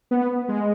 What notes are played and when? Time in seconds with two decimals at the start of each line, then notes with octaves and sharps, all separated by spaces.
0.11 B3
0.49 G#3